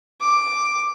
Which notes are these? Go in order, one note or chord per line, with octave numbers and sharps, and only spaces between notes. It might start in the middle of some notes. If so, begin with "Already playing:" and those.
D6